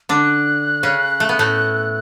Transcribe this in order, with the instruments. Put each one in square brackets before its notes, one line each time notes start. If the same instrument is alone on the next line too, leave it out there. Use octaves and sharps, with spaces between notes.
[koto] D3 D4 [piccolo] F#6
[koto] C#3 C#4
A3
B3
A2 A3